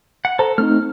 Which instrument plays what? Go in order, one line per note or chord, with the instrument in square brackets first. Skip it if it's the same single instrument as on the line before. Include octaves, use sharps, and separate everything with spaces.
[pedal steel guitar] F#5
[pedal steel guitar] A4 [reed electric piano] C5 A#5
[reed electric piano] A3 C4 D#4 [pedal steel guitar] F6